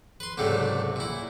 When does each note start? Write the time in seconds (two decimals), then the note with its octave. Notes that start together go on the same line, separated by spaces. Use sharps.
0.20 B4 C6
0.38 C2 G#2 C#3 F#3 G3 A3
0.96 A#2 E4